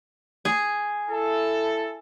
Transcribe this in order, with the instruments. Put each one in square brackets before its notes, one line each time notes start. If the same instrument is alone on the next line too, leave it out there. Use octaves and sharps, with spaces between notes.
[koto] G#4
[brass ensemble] E4 A4